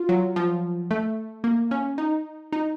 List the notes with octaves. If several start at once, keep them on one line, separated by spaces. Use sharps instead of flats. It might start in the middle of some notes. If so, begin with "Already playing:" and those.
Already playing: F4
F#3
F3
A3
A#3
C#4
D#4
D#4